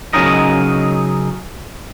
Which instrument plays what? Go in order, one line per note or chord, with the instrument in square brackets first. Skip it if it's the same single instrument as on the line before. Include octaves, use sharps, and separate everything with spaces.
[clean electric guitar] C#3 F#3 C#4 D#4 A#4 D#5